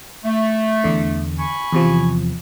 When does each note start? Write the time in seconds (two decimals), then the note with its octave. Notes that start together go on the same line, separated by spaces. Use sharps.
0.25 A3
0.84 E2 D3
1.39 G#5 B5 C#6
1.72 E2 C3 F3